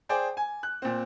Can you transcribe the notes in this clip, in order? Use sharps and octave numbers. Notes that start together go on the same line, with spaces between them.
G#4 C5 D5 G5
G#5
F#6
A#2 C4